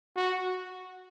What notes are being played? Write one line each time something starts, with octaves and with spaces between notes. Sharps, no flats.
F#4